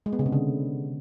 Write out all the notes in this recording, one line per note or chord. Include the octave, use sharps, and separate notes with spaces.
G#3
B3
C#3
C3
D3